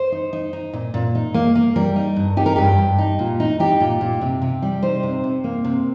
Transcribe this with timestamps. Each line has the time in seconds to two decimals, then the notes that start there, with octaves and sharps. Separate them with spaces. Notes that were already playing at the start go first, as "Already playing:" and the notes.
Already playing: C5
0.12 D#4
0.33 D#4
0.53 D#4
0.73 A#2
0.94 A#2
1.15 D#4
1.34 A#3
1.55 A#3
1.76 G3 A#4
1.96 D#4
2.16 G2
2.37 D#4 G4
2.46 A#4
2.56 G2 G4
2.78 G2
2.98 D#4
3.19 A#2
3.40 D#4
3.60 D#4 G4
3.80 A#2
4.01 A#2
4.21 C3
4.42 C3
4.62 G3
4.83 D#4 C5
5.03 C3
5.24 C3
5.44 A#3
5.64 C3